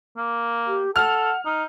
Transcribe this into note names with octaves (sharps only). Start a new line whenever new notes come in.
A#3
G4
A4 F#5 F6
D#4 F6